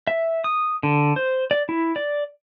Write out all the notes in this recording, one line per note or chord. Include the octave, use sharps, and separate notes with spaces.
E5
D#6
D3
C5
D5
E4
D5